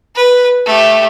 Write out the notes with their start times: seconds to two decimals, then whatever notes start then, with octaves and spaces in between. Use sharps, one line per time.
0.16 B4
0.66 A3 G4